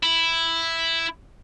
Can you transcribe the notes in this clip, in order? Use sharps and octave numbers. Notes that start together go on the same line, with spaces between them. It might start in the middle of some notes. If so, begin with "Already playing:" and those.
E4